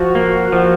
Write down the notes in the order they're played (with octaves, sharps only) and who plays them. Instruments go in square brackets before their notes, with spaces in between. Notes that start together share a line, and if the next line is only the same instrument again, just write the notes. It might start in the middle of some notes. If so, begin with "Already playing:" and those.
Already playing: [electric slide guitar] F3 [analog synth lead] F#4
[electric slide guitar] A#3
F3